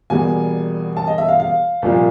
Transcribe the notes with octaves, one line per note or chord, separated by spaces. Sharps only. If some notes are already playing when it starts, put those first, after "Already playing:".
E2 B2 G3 A#3 G#5
A5
D#5
E5
F5
F5
C2 A#2 F3